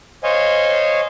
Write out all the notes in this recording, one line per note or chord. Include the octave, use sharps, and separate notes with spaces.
C5 C#5 D#5 F5 G#5